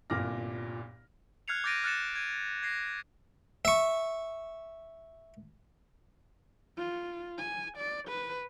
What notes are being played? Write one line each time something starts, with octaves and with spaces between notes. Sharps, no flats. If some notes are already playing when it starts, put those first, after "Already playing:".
G1 C2 A#2 D6 F6 A#6
F6 F#6 G#6 C7 C#7 F7
D6 G6 A6 A#6 D7 D#7
F6 F#6 A6 C#7 E7
G#6 D#7
G#6 A#6 C7
E5 C#6
F4
G#5
D5
B4